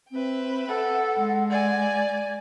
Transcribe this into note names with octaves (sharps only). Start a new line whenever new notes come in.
C4 B4 E5 G5
A4 F#5
G#3
D5 G#5